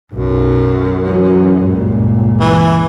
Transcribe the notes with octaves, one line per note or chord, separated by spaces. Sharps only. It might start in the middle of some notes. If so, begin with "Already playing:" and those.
B1 F#2
E3 F#3 C#4
C#2 G2 A#2
E3